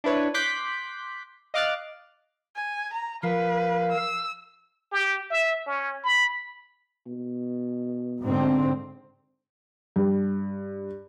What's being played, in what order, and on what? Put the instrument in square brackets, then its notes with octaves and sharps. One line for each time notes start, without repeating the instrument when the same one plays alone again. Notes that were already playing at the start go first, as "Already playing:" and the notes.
[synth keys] D4 E4 B4 C#5
C6 D6 F#6 G6 B6
D#5 F5 D6 F6 F#6 A6
[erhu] G#5
A#5
[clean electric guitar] F3 [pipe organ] A#4 F5 [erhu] B4
[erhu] E6
[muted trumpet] G4
E5
C#4
B5
[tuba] B2
[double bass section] G#2 D3 C4
[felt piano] G2